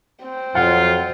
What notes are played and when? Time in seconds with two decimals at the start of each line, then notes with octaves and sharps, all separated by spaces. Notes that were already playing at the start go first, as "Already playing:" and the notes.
0.25 C4
0.55 F2 F#3 F4 F#5